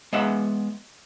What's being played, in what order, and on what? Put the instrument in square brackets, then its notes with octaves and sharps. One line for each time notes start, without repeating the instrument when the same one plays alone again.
[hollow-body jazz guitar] G#3 B3 E5 F#5